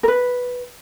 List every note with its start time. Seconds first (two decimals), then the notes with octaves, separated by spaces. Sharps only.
0.03 A#4
0.08 B4